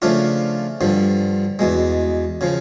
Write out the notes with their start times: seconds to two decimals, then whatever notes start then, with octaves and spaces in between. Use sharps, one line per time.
0.02 C#3 F3 A3 D4 F4
0.81 G2 D3 F3
1.59 E2 B2 G#3
2.41 C#3 F3